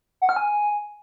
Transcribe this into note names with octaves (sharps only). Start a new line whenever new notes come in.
F#5
F6
G#5